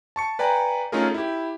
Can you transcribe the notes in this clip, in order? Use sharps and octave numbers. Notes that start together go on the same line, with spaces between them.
A5 C#6 C#7
B4 D5 G5 G#5 A#5
A3 C#4 D#4 F4 G#4 A#4
E4 G4